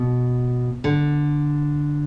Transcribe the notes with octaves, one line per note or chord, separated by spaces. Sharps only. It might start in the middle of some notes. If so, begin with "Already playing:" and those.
Already playing: B2
D3